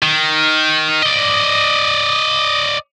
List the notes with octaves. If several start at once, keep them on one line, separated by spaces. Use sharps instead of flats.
D#3
D5 D#5